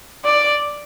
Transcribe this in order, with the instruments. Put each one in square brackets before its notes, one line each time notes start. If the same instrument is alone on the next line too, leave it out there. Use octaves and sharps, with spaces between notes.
[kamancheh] D5